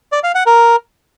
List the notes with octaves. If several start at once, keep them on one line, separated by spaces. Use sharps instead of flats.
D5
F5
F#5
A#4